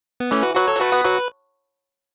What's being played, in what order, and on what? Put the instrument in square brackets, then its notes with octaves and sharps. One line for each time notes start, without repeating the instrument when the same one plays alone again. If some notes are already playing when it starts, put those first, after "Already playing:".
[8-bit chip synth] B3
[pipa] E3 [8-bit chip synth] A3 C#4
[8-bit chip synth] F#4 B4
[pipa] F#3 [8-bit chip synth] F#4 B4
[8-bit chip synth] A4 C#5
[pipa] F#3
[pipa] A3 [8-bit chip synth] F#4 B4
[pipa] B3
[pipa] F#3 [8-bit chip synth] F#4 B4